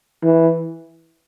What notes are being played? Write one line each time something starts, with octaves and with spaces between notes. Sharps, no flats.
E3